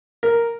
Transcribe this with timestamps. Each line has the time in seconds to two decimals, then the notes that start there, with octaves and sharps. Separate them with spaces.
0.23 A#4